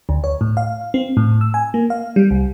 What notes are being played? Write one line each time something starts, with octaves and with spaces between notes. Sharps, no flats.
D2
C#5
A2
F5
C4
A2
E6
G#5
A#3
F5
G3
C2